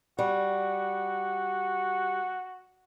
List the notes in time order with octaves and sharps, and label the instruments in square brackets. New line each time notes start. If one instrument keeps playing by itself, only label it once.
[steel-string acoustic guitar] G3 [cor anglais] F#4